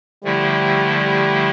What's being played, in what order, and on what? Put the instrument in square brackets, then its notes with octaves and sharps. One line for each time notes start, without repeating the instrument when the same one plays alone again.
[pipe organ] D3 F3 A3 E4 [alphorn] G3
[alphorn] G3